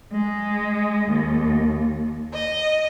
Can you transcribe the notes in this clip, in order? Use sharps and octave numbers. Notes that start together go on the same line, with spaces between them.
G#3
D#2
D#5